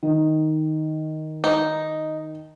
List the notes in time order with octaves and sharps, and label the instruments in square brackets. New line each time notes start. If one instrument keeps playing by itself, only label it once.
[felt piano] D#3
[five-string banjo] D#4